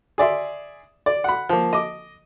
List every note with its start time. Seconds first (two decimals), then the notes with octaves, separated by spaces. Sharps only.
0.18 G#4 D5 E5 C6
1.06 D5
1.24 F#5 B5
1.49 F3 A#3
1.73 D#5 D6